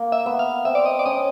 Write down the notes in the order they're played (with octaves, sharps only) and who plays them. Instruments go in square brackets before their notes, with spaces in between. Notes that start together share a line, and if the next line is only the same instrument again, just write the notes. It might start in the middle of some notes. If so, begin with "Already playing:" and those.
Already playing: [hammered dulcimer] A#3
[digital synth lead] E5
[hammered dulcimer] B3
[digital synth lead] F5
[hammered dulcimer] C4 [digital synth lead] E5
[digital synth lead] D5
D#5
D5
[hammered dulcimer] C#4 [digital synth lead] D#5